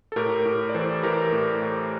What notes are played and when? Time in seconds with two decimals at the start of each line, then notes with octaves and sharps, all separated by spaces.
0.12 A4
0.16 A2 G4 A#4
0.45 A2
0.69 D5
0.74 E3 A4 C5
1.03 E3 G4 A#4
1.32 A2
1.62 A2